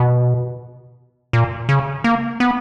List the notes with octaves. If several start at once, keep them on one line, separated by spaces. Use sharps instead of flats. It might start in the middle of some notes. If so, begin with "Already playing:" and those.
Already playing: B2
A#2
C#3
A#3
B3